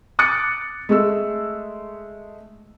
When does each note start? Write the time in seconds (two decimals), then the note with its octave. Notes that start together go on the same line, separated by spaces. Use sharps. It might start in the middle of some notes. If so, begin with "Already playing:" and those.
0.19 D6 D#6 F#6 A6 C#7 D7
0.89 G#3 A3 E6